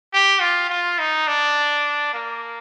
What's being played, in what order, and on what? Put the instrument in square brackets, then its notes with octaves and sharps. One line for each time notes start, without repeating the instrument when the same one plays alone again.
[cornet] G4
F4
F4
D#4
D4
A#3